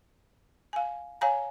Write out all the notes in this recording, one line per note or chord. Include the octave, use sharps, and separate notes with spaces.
F5 G#5
C#5 F5 G#5 A#5